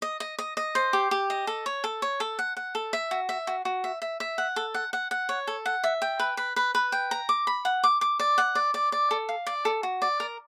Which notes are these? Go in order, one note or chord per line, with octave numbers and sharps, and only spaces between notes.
D#5
D#5
D#5
D#5
C5
G4
G4
D#5
A4
C#5
A4
C#5
A4
F#5
F#5
A4
E5
F#4
E5
F#4
F#4
E5
E5
E5
F#5
A4
F#5
F#5
F#5
C#5
A4
F#5
E5
G5
B4
B4
B4
B4
G5
A#5
D6
B5
F#5
D6
D6
D5
F#5
D5
D5
D5
A4
F5
D5
A4
F#4
D5
A#4